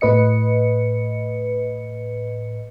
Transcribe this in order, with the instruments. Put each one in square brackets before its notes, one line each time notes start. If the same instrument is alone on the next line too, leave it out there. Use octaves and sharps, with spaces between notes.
[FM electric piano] A2 B4 D#5 C#7